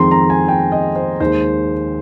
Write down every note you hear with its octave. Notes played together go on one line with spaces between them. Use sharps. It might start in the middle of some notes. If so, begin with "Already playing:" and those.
Already playing: F2 D#3 G#3 C4 A#5 C6
A#5
G#5
G5
D#5
C5
D#2 D#3 G#3 C5